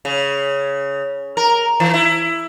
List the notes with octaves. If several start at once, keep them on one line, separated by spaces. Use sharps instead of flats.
C#3
A#4
E3
E4